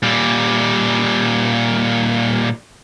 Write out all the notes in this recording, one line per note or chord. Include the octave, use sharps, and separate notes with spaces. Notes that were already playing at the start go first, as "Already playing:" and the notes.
A#2 G3